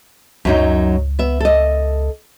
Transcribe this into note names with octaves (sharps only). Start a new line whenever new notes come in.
C#2 F#2 F#3 D#4
B3 E5
A4 D#5